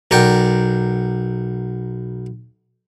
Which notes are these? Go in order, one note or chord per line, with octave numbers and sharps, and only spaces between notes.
B1 A#4 D5 F#5 G5